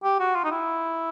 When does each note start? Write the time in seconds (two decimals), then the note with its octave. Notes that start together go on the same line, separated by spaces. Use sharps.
0.04 G4
0.20 F#4
0.35 F4
0.44 D#4
0.51 E4